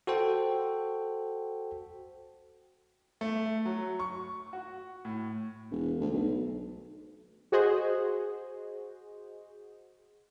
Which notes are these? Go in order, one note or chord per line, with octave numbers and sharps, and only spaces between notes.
F#4 A4 C5 G5
A3
F#3
C#6
F#4
A2
E1
D2
B1
F#4 G#4 C5 D#5